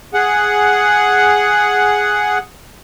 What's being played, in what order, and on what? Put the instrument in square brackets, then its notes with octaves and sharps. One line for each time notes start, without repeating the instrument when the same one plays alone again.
[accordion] G#4 F#5